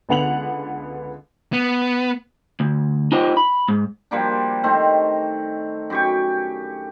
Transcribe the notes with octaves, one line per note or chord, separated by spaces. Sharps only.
C#2 D3 B3 F#5 F7 F#7
B3
D2
D#4 F4 G4 C5 D#5
B5
G#2
F3 G3 A#3 D4
D#3 A3 C4
F#2 G4 C#6